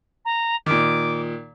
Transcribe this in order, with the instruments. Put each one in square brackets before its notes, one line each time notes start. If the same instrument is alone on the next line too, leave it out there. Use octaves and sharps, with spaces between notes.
[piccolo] A#5
[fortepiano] A#2 D#3 [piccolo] D6